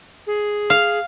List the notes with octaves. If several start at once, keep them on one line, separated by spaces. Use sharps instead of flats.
G#4
F5